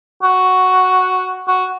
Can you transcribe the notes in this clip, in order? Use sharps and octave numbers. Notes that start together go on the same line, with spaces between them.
F#4
F#4